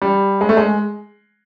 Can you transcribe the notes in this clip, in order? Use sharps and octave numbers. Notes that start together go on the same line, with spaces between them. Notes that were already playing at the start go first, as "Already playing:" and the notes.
G3
G#3
A3
G#3